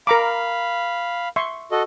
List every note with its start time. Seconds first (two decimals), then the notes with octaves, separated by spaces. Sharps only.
0.07 A#4 F5 A#5 B5 D6
1.36 E5 C6 C#6
1.71 F#4 A4 D#5